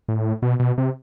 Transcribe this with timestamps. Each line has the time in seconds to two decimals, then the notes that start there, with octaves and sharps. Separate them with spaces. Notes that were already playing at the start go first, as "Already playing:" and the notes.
0.09 A2
0.42 B2
0.60 B2
0.78 C3